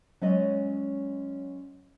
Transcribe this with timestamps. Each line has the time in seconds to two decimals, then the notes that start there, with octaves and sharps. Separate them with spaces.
0.21 F#3 G#3 C#4 D5 D#5